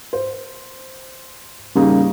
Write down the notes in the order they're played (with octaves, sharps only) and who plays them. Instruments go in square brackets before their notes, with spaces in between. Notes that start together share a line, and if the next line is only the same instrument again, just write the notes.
[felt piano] C5
[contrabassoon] C#3 [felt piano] G3 A#3 D#4